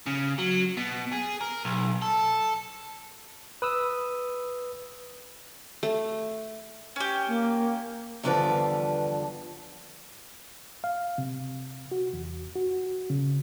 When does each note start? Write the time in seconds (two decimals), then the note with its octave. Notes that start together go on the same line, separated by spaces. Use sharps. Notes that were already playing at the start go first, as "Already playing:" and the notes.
0.06 C#3
0.38 F#3
0.77 B2
1.13 G#4
1.41 A#4
1.65 B1
2.02 A4
3.62 B4 D#6 E6
5.83 A3
6.96 C#4 G4 G#5
7.28 A#3
8.23 E2 G2 D3 F3 B4 D5
10.84 F5
11.18 C3
11.91 F#4
12.13 E2
12.56 F#4
13.10 C#3